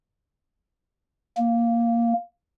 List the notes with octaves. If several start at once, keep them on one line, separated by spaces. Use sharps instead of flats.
A#3